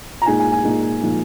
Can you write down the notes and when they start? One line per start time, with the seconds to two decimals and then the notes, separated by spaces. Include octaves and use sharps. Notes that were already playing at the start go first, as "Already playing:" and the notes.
0.22 A#5
0.26 A#2 G#3 D#4 G#5
0.40 G#5
0.52 G#5
0.64 A#2 G#3 D#4
1.03 A#2 F3 G#3 D#4